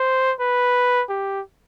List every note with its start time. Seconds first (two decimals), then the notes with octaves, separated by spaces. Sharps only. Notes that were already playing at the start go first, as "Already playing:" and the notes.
Already playing: C5
0.40 B4
1.09 G4